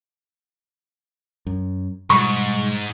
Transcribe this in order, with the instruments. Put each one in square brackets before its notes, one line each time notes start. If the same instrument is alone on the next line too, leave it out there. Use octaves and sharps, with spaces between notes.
[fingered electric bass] F#2
[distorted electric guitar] G#2 [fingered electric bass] B2 G3 G#3 [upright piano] C#6